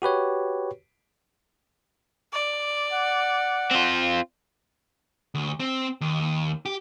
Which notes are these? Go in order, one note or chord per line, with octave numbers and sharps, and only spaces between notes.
F#4 G4 B4 C#5
D5
F#5
C4 F4
D2
C4
D#2
G4